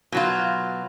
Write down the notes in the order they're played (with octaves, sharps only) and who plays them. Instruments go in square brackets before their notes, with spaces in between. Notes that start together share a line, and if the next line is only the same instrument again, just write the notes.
[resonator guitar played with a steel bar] B2 F#3 F4